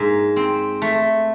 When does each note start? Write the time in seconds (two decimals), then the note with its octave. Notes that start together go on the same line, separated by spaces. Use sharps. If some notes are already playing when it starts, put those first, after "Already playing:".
Already playing: G#2 A#3
0.36 C4
0.82 A3